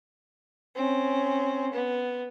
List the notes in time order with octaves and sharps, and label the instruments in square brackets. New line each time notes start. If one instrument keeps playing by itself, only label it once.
[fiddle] C4 C#4
B3